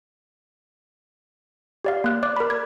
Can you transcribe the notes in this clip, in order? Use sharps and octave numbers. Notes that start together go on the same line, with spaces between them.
G4 D5 F5
A#3 F#6
D5 D6 F#6
A#4 B5
G#6